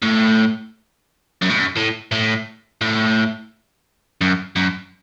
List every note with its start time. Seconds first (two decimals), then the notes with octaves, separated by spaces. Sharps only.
0.03 A2
1.42 F#2
1.50 A2
1.59 F#2
1.77 A2
2.12 A2
2.82 A2
4.21 F#2
4.56 F#2